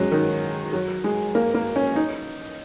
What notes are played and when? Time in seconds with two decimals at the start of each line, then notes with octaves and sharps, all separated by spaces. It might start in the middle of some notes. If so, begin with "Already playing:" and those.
Already playing: F#3 G#3 C#4
0.12 D#3
0.73 F#3
1.04 G#3
1.35 A#3
1.54 A#3
1.76 C#4
1.96 D#4